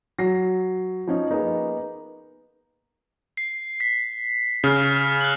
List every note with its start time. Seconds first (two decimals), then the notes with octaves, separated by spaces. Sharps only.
0.19 F#3 A#6 C7
1.07 F3 C#4 D#4
1.31 A#3 B3 D#4 G#4
3.37 C7
3.80 B6
4.64 C#3 F6
5.21 F#6 F#7